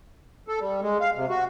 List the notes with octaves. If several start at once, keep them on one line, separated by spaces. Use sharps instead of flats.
A4
G3
G#3
F5
C3
F#4